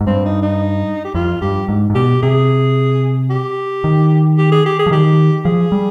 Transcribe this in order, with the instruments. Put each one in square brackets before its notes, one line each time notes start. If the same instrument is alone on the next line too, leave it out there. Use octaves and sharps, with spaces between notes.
[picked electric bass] G#2
[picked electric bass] G2 [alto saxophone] C4
[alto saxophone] D#4
D#4
G4
[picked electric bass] F2 [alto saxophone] F4
[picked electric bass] G2 [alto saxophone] G4
[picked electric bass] G#2
G#2
[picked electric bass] B2 [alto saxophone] G4
[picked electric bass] C3 [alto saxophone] G#4
[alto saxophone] G4
[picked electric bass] D#3
[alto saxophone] G4
G#4
G4
G#4
[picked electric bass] F3
[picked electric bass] D#3 [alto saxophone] G4
[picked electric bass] F3 [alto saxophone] G#4
[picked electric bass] G3